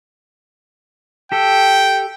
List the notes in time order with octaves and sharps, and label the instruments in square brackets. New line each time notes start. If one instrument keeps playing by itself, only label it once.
[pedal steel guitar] G4 A4 [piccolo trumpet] G5